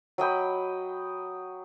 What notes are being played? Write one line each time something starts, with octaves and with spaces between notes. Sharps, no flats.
F#3 D#5 G5 B5